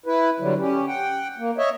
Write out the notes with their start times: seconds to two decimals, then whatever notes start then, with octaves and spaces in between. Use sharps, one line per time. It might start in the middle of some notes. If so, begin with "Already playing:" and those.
0.06 E4 B4
0.40 D3 F#3 G3
0.59 C#4 G4
0.88 F#5 G5
1.38 A#3
1.58 C#5 D#5 E5